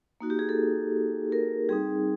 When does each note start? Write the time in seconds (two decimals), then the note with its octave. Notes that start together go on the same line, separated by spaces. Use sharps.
0.21 A#3 D#4 F#4
0.30 G4
0.39 G#4
0.49 A4
1.32 A#4
1.69 G3 C4 D#4 G#4